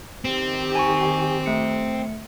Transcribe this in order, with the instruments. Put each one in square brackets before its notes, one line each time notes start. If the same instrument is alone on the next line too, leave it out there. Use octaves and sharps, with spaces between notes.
[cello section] D#3 G4 [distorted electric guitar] C4
[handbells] G#5 A#5 C#6
A3 C#7